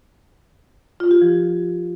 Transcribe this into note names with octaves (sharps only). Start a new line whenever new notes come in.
F4
G4
F3